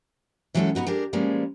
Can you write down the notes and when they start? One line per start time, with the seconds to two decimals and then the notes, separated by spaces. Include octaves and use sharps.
0.54 E3 F#3 G#3 C#4 D#4 A4
0.75 B2 B3 D#4 F#4
0.87 G#3 D4 G4 A#4
1.13 B2 F3 G3 G#3 A#3 C#4